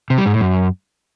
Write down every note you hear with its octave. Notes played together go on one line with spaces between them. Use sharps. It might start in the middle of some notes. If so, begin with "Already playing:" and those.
C3
G3
G#2
A2
F#2